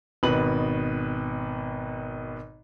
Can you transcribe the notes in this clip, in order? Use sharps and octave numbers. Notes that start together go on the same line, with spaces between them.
G#1 B2 D#4 B4 F#7